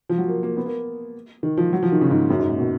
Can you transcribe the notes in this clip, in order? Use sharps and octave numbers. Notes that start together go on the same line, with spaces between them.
F3
F#3
A#3
A#3
B3
A#3
D#3
F3
F#3
F3
D#3
C#3
G#2
F#2
G#2
A#2
B2